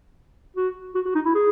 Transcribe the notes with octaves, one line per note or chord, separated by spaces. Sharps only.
F#4
F#4
F#4
D#4
E4
G#4